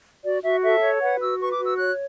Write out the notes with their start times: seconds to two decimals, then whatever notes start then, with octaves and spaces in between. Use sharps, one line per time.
0.24 F#4 D5
0.43 F#4 E5
0.63 A4 E5
0.82 C#5
1.02 B4 F#5
1.21 F#4 E6
1.40 B4 C#6
1.52 D6
1.59 F#4
1.66 E6
1.78 C#5 F#6